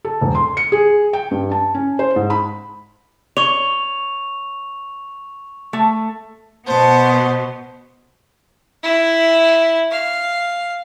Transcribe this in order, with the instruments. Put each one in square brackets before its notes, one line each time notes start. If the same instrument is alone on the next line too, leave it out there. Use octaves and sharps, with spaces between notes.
[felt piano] A4
E1
C6
C#7
G#4
G5
G2
A5
C#4
C5
G#2
B5
[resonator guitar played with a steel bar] C#5 [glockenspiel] C#6 F7
[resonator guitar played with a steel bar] A3
[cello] B2 B3 [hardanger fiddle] C5 A5
[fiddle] E4
F5